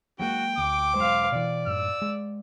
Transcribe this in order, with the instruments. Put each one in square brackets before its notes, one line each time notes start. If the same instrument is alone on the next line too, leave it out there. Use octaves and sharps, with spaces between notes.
[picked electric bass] F#3 G#3 A#3 [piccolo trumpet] F#4 [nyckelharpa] G5
[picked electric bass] D2 [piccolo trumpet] D6
[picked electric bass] E1 F#3 G#3 [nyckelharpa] C5 F5
[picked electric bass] B2 E3 [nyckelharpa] D5
[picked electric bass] F#2 A2 [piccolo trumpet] E6
[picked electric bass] G#3